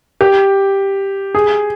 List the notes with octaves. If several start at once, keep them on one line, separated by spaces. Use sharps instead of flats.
G4
G#4